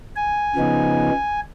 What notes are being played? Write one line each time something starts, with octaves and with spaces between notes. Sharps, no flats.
G#5
C#3 F3 B3 D#4